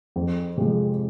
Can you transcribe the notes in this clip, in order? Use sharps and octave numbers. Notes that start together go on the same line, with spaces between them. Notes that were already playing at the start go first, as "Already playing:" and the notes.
F2
C3 F3 G#3